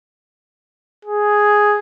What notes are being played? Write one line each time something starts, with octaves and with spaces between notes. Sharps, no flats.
G#4